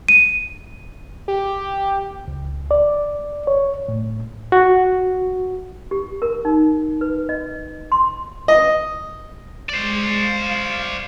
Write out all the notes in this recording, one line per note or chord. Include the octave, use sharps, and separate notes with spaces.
D#7
G4
C#2
D5
C#5
A2
F#4
G4
A#4
D#4
B4
D#5
C6
D#5
G#3 C5 D5
F5